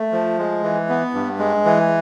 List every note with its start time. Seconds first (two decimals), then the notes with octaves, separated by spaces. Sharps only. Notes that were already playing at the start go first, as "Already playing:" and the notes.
Already playing: A3
0.12 F3
0.38 G#3
0.63 E3
0.89 B3
1.14 G2
1.39 G#3
1.65 E3